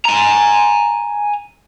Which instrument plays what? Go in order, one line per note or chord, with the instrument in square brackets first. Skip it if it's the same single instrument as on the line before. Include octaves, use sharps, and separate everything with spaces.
[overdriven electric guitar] G#5 A#5